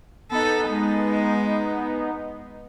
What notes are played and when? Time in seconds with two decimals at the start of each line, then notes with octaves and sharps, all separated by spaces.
0.32 B3 D#4 A4
0.68 G#3